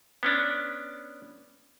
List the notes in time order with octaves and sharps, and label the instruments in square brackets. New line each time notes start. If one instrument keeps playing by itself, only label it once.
[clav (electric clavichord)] B3 C#4 D4